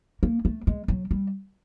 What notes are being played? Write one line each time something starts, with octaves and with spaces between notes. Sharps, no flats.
A#3
A3
G#3
F#3
G3